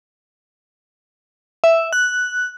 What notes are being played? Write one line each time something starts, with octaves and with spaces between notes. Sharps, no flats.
E5
F#6